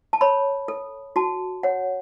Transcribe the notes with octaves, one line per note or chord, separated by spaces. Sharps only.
A5
C#5 B5
A4
F#4 A5
C#5 F#5